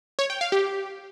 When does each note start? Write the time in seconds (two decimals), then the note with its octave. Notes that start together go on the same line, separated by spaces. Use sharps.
0.19 C#5
0.30 G5
0.41 F5
0.52 G4